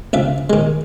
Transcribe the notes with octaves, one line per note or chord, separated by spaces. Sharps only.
C#2 E5 F5
D#3 G#3